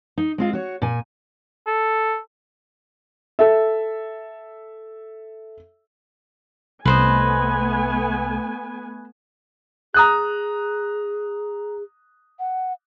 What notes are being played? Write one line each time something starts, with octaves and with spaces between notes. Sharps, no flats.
D#4
G#3 C4 F4
F#4 C#5
A#2 G#5
A4
A4 E5
C2 A3 B3 B4 C5 D#5 G#5
G#4 A#5 D#6 F#6
F#5